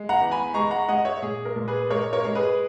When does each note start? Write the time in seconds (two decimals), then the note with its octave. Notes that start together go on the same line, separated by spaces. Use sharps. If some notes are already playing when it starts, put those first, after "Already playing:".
Already playing: G#3
0.09 F#5 A#5
0.20 E2
0.31 G#5 B5
0.54 G#3 A#5 C#6
0.71 F#5 A#5
0.88 G#3 D#5 F#5
1.05 C#5 E5
1.22 A#2 G#4
1.45 A#4
1.56 A#2
1.68 G#4 B4
1.90 G#3 A#4 C#5
2.13 A#4 C#5
2.24 G#3
2.35 G#4 B4